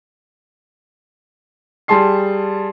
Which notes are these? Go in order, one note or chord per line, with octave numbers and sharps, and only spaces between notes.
G3 G#4 A5 C6 C7